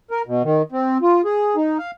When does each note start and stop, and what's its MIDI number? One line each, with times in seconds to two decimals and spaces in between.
0.11 0.22 70
0.27 0.42 47
0.44 0.62 51
0.72 0.98 60
1.02 1.21 65
1.25 1.56 68
1.56 1.78 63
1.78 1.91 77